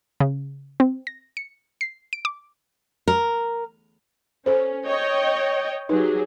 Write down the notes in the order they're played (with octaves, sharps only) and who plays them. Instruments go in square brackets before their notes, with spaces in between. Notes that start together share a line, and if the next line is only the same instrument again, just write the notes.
[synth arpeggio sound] C#3
C4
A#6
C#7
C7
D7
D6
[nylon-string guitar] A#4
[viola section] C#4 [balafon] A4 C5
[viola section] C#5 D#5 G5
[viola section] F#3 G4 G#4 [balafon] D#4 B4